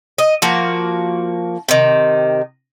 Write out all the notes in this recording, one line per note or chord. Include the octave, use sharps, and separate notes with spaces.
D#5
F3 A#3 F#4
C3 D#3